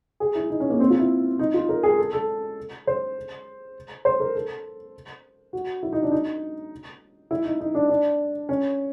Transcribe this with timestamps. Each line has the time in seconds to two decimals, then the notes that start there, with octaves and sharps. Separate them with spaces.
0.20 G#4
0.35 E4
0.50 D#4
0.60 C#4
0.70 A#3
0.80 C4
0.90 F4
1.00 E4
1.39 D#4
1.54 F4
1.69 A#4
1.83 G#4
1.98 A4
2.13 A4
2.87 C5
4.05 C5
4.20 A#4
4.35 A4
5.53 F#4
5.83 E4
5.93 D#4
6.02 D4
6.11 D#4
7.31 E4
7.45 D#4
7.61 D#4
7.75 D4
7.90 D4
8.49 C#4